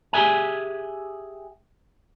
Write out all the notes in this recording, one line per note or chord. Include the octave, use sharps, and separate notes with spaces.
G4 G#4 E5 G#5